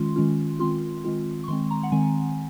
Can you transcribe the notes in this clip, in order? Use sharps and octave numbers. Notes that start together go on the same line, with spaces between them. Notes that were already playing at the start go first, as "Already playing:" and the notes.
Already playing: D#3 G#3 C#4 F4 C6
D#3 G#3 C#4 F4
D#3 G#3 C4 F4 C6
D#3 G#3 C4 F4
C#6
D#3 G#3 C4 C6
A#5
F#5
D#3 G#3 C4 G#5